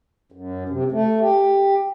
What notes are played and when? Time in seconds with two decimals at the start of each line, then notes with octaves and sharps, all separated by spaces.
0.32 F#2
0.69 C3
0.92 A3
1.21 G4